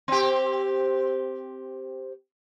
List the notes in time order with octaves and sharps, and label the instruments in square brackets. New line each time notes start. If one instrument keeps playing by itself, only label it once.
[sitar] C4 G4